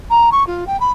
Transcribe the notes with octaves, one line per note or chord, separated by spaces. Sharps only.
A#5
C#6
F4
G5
B5